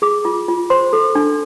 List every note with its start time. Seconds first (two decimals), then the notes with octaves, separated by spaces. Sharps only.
0.02 G#4 D6
0.24 F4 D6
0.48 F4
0.70 C5 C6
0.93 A4
1.15 D4